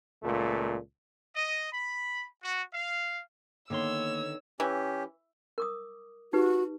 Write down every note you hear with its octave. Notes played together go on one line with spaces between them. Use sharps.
C#2 A#2 A3
D#5
B5
F#4
F5
D3 D#3 A#3 B3 C#5 C6 E6
E3 C#4 G4
A#4 D6 D#6
D#4 F#4 G4 B4